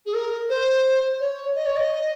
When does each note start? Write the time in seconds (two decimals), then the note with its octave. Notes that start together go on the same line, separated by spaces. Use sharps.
0.06 G#4
0.14 A#4
0.49 C5
1.19 C#5
1.54 D#5
1.65 C#5
1.76 D#5